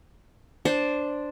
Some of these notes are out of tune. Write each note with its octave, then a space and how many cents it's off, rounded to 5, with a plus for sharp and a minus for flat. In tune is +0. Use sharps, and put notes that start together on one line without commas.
D4 +0 C5 +0